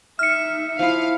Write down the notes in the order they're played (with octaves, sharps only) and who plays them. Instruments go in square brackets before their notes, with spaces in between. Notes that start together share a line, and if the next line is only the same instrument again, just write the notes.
[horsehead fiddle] D#4 E5 [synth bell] F6 C#7
[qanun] F3 E4 [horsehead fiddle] D#4 [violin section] F5